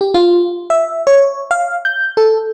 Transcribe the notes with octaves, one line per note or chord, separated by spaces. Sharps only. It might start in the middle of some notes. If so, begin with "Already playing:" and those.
G4
F4
E5
C#5
F5
G6
A4